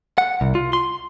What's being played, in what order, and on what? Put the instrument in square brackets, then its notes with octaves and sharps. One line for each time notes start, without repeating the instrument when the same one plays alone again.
[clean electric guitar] F#5
C2
F4
C6